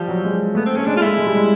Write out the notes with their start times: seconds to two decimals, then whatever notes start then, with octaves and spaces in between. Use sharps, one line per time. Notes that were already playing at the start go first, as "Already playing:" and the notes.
Already playing: F3 G3
0.08 F#3
0.24 G#3
0.55 A3 B3
0.66 C4
0.76 A3 C#4
0.86 G#3 D4
0.96 F4
1.01 A3 E4
1.17 G#3
1.26 G3
1.35 G#3